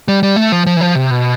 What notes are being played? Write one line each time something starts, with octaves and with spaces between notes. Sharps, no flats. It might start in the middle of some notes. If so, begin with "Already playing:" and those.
G3
G3
A3
F3
F3
E3
F3
C3
B2